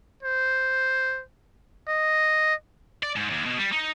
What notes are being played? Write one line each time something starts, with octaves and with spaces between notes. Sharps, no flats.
C5
D#5
D5
G#2
D#2
B2
G3
D#4